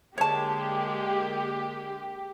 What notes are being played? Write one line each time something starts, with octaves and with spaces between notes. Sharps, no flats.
D3 G#3 A#3 G4 C#5 A5